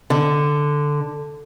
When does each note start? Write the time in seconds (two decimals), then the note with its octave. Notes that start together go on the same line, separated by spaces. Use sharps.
0.10 D3